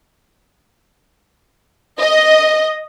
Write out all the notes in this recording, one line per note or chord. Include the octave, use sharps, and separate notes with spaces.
D#5